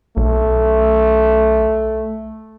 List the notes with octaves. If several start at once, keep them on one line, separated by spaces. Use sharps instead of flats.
B1 A3